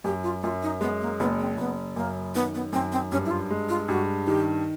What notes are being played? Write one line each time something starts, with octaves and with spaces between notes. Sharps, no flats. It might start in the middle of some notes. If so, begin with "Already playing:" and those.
F#2 G4
F4
F#2 F4
D#4
G#3 B3
A#3
F#1 B3
C4
F#1 B3
F#2 A#3
D#3 B3
B3
F#2 C4
C4
G2 C#4
E4
F4
G#3
F4
G2 F#4
D#3 G4